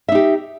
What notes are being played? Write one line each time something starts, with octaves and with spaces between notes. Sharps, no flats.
D#4 G4 E5